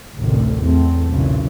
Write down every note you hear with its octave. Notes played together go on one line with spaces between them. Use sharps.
A1 D2 C3 D#3
E2 A3 C4
B1 A#2 C#3 E3 F#3